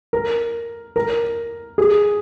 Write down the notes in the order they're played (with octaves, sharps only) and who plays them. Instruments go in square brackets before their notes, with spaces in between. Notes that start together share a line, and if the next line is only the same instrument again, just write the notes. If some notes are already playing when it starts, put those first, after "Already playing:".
[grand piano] A#4
A#4
G#4